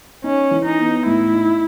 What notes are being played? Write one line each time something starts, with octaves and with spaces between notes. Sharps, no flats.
C#4 D#4
E3
D#4
B3
A2 E4
D#4